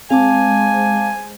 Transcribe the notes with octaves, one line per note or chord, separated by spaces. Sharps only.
G#3 C4 C5 F5 G#5 A5 D6